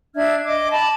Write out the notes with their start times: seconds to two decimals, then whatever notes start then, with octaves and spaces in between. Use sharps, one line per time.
0.15 D4 E5 F6 G#6
0.45 D#5 D6
0.71 A5 B5